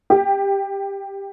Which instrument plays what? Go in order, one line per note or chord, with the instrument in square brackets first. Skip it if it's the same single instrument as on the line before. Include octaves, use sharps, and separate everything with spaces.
[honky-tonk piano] G4